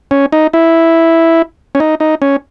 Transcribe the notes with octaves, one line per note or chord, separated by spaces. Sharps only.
C#4
D#4
E4
C#4
D#4
D#4
C#4